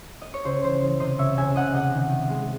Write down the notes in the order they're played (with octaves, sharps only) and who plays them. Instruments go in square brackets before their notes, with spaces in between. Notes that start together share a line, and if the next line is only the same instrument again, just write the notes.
[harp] D#5
C#5
C#2 C5
E3 C5
E3
C3 C5 D#5
C#2 C#5 E5
C#2 E5 G#5
C3 D#5 F#5
C3 D#5 F#5
D#3
D#3
G#3